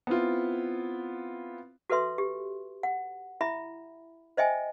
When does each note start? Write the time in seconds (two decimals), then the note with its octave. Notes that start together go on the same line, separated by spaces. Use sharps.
0.07 B3 C4 E4 F4
1.90 F#4 A4 B4 E5 C6
2.18 G4
2.83 F#5
3.41 E4 E5 B5
4.37 C5 D#5 E5 G5 G#5